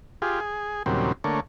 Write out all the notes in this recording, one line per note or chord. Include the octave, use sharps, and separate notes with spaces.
F4 G4 G#4
G#4
D#2 A#2 C#3 F#3 G3 C4
D3 A3 A#3 C#5